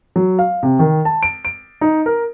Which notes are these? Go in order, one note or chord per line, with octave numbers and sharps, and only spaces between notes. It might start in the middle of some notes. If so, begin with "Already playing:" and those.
F#3
F5
C3
D#3
A5
D7
D7
D#4
A#4